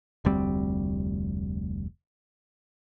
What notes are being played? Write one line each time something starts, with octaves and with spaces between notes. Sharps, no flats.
F1 D2 G3 C4